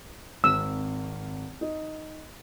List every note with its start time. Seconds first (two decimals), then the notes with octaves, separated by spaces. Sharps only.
0.44 G#1 C4 E6 F6
1.61 D#4